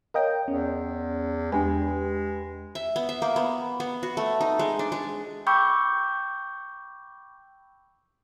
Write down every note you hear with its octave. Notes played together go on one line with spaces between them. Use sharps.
A#4 C#5 D#5 F5 G5
E2 C#4
E2 G#3 D4 G4 B4 G#5
E5
B3
E5
A#3
B3
B3
F#4
A3
D#4
G#3
D4
G#3
G5 B5 C#6 D6 E6 G6